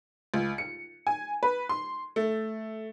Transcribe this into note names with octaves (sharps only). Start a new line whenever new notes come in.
C#2
C#7
G#5
B4
C6
A3